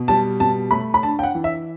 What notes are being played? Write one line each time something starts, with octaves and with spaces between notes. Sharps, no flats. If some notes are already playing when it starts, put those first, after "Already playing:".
Already playing: B2
G3 A5
B2 A5
A3 B5
B5
D4 A5
G5
F#5
E3
E5